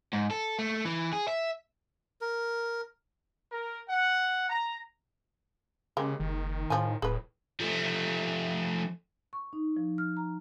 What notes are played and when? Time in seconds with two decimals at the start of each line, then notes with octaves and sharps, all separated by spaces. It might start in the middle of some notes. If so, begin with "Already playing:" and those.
0.13 G#2
0.31 A4
0.59 A3
0.85 E3
1.13 G#4
1.28 E5
2.21 A#4
3.52 A#4
3.88 F#5
4.49 A#5
5.97 C#3 G#3 A#3 G4
6.20 F#1 D#3
6.70 A2 F3 G#3 G#5
7.02 D1 A2 G#4 B4
7.60 F3 A3
9.33 C#6
9.53 D#4
9.77 F3
9.98 F6
10.17 A#5